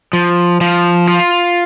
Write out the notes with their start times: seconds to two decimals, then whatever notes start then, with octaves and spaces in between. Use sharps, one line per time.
0.13 F3
0.61 F3
1.08 F4